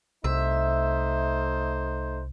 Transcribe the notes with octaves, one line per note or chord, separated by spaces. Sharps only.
C2 A3 D#4 C5 E5